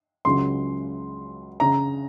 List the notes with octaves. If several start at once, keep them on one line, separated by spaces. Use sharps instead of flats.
C#2 C#3 F#3 C6
C#3 A#5